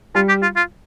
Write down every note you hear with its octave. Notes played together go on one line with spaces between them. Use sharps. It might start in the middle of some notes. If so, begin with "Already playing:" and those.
G3 F4
G4
F4
F4